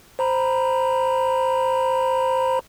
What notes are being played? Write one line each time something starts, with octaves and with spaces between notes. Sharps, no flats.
C5 A#5 B5